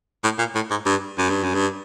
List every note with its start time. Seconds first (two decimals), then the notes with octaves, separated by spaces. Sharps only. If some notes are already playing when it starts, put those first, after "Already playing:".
0.24 A2
0.39 A#2
0.55 A2
0.71 G#2
0.86 G2
1.18 F#2
1.29 G2
1.43 F#2
1.55 G2